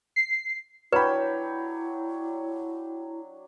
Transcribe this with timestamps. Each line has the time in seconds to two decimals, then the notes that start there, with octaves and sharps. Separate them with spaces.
0.16 C7
0.92 F#3 D4 E4 B4 C#5 G5 B5